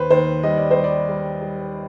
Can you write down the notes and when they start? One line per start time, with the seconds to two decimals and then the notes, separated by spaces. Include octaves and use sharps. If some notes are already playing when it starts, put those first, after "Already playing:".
Already playing: D#2 D#3 B4 C5
0.10 D#2 C5
0.43 G3 D#5
0.57 D5
0.71 C5
0.76 G3
0.84 D5
1.09 G3
1.42 G3